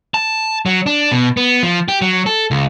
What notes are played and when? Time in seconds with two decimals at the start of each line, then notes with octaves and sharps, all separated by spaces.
0.14 A5
0.66 F#3
0.86 D4
1.12 B2
1.37 B3
1.63 F3
1.88 G4
2.01 F#3
2.26 A4
2.51 C#2